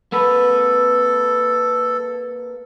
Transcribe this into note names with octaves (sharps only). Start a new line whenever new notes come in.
A#3 A4 B4